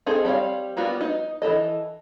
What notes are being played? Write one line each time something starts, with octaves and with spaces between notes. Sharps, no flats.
C4 D#4 G#4 A4
G3 C4 C#5 F5
G3 A#3 B3 F4 F#4
D#4
E3 A#3 A4 D#5